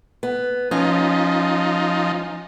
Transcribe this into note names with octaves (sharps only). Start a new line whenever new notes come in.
B3
F3 C#4 D#4